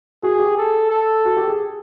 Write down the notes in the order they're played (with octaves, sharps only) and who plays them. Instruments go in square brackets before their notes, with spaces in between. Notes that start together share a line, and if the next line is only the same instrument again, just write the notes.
[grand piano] F#4 [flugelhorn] G#4
[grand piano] G4
[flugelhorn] A4
A4
[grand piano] F#4
G4
G#4